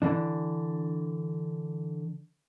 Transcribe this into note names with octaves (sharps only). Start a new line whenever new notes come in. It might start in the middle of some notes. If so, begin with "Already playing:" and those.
D3 E3 D4